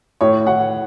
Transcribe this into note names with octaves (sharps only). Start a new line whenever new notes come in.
A2 C#5
A2 F#5